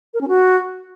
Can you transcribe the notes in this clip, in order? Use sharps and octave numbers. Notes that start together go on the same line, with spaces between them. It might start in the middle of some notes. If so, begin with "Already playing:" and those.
A#4
C#4
F#4